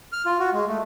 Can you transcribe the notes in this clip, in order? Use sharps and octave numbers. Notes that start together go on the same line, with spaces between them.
F6
F4
F#4
G#3
A3